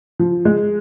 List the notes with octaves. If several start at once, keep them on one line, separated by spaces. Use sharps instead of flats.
F3
G#3